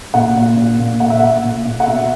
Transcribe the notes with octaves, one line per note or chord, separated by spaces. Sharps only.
A#2 F#5
A#2
A#2
A#2
A#2 F#5
E5
A#2 F#5
A#2
A#2
F#5
B2 E5